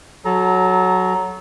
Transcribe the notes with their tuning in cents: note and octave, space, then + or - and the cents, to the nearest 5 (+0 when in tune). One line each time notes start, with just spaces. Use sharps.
F#3 +0 A4 -30 A#5 +0